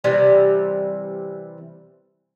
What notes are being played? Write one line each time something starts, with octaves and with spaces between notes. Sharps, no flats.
C3 E3 G3